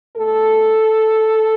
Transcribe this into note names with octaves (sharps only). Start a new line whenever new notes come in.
B2 A3 A4